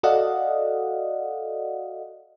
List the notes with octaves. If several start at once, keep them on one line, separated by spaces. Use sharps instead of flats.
F#4 A4 D5 D#5 F5 F#5